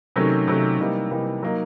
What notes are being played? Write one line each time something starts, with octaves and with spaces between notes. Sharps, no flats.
C3 D#3 F#3 A3 C#4
C3 D#3 F#3 A3 C#4
C3 E3 G3 A#3 D#4
C3 E3 G3 A#3 D#4
F#3 A#3 D#4